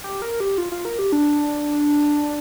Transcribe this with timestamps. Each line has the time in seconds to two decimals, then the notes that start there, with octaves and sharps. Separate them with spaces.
0.04 G4
0.22 A#4
0.40 G4
0.58 F4
0.72 F4
0.85 A#4
0.99 G4
1.12 D4